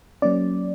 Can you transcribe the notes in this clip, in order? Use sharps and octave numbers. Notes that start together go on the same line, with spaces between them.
F#3 A#3 C#4 D5